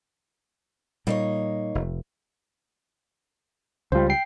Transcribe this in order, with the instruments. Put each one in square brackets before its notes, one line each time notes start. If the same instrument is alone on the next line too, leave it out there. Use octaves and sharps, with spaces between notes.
[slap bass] A#2 G3 [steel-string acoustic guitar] A#3 D#4 C#5
[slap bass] F1
[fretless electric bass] C#2 G3 [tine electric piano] F4 C5
[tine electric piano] G5 C7